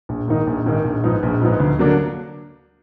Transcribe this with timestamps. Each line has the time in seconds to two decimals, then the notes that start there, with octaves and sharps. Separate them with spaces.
0.09 A#1
0.28 G#2 D#3 A#3 D#4
0.47 A#1
0.66 G#2 D#3 A#3 D#4
0.85 A#1
1.04 G#2 F3 B3 D#4
1.23 A#1
1.42 G#2 F3 B3 D#4
1.60 D2
1.79 D3 F#3 A#3 D4